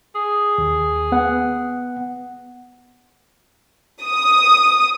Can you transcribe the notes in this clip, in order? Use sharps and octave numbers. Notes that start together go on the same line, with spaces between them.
G#4
D#2
B3 F#5
D#6